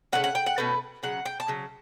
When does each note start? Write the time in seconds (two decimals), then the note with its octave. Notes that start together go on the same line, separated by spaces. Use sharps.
0.12 C#3 E3 A3 C#4 F#5
0.24 F#5
0.35 G5
0.46 F#5
0.58 B2 A3 C#4 B4
1.03 C#3 F#3 F#5
1.26 G5
1.40 A5
1.48 C#3 F#3